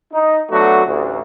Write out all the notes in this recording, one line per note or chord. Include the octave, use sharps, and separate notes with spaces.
D#4
F#3 A3 B3 D4 F#4
A1 D2